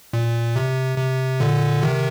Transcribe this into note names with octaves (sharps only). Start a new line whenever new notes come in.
A#2
C3
C3
A#2 D3
C3 D#3